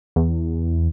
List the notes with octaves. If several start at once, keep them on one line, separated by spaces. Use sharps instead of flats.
E2